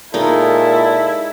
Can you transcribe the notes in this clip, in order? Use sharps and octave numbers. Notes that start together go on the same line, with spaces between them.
A#2 G#3 D#4 E4 A4